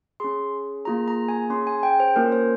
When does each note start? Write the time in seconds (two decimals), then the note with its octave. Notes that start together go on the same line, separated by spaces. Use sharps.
0.20 C#4 G#4 C6
0.85 A#3 F4 G#4 A#5
1.08 A#5
1.29 G#5
1.50 C#4 C6
1.53 G#4
1.67 G#5
1.83 G5
2.00 C5
2.16 A#3 C#4 F4 A#4
2.32 C5